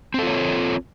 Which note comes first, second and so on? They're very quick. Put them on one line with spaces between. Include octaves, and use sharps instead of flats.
C4 A4 F4 C#5